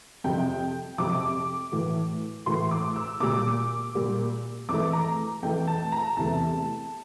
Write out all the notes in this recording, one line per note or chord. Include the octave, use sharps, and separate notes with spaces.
F2 C3 F3 G5
F2 C3 F3 D6
A2 E3 A3
A2 E3 A3 C6
D6
E6
A#2 G3 A#3 D6
A#2 G3 A#3
F2 E3 A3 D6
A#5
F2 E3 A3 G5
A5
A#5
E2 C3 E3 A3 A5